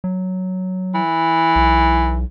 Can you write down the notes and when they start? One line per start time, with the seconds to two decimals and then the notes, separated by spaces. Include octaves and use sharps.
0.04 F#3
0.95 E3
1.56 B1